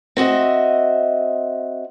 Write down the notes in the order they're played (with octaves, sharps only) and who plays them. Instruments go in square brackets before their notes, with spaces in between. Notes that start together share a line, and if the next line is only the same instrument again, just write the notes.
[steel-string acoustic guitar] C4 F#4 D#5 E5